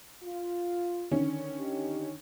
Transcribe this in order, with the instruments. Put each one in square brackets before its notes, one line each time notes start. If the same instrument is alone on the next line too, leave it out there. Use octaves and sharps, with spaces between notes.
[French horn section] F4
[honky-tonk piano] D3 D#3 C#4
[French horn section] D#4 G4